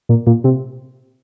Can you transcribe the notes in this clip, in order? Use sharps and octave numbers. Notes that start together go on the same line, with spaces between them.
A#2
A#2
C3